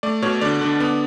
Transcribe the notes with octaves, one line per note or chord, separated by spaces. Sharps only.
A3 D5
B2 C#5
D3 D5
D3
B3